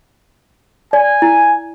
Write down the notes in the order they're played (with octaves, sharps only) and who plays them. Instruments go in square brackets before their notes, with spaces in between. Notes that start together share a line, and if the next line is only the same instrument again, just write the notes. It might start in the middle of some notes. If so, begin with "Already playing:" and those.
[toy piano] D5 [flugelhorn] G#5
[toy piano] E4